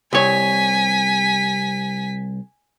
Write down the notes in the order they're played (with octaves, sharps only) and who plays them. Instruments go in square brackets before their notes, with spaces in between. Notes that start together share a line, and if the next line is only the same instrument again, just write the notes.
[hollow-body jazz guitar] C2 C#5 [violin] G#5 B6